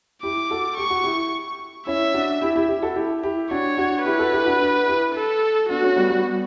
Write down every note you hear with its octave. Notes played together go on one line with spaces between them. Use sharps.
E4 G4 D6
F#4 A4
G4 C#6
F#4
E4 G4
C#4 E4 E5
D4 F#4
E4 G4
E4 G4
E4 G4
F#4 A4
E4 G4
E4 G4
D4 F#4 C#5
D4 F#4
E4 G4 B4
F#4 A4
E4 G4
D4 F#4
D4 F#4
E4 G4
A4
B3 D4 F#4
A3 C#4
G3 B3
G3 B3